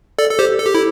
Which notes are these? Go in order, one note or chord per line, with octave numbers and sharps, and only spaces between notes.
A4 D5
A4
G4 C5
A4
G4
E4